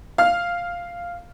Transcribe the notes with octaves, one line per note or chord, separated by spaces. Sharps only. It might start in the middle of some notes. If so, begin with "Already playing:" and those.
F5 F6